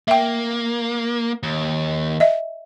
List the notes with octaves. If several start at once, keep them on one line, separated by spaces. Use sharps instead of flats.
A#3 E5 G5
D#2
D#5 E5